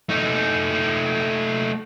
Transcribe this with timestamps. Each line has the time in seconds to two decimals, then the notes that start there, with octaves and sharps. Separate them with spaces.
0.09 A3 D#4